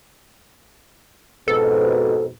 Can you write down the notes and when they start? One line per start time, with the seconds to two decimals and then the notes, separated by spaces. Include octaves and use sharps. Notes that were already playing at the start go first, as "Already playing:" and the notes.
1.48 F2 G#2 B2 A4